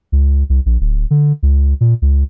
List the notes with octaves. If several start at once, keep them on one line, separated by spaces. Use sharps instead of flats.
C#2
C2
A#1
D1
D3
C#2
A#2
C#2